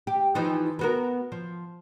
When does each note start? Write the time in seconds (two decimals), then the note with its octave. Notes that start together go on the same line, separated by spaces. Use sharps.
0.07 G4
0.35 E3 F3 D#4
0.79 B3 F#4 A#4
1.32 F3